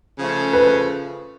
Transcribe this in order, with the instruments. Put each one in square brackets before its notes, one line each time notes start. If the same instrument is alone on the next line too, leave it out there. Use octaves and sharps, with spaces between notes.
[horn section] C#3 F3 A3
[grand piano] B4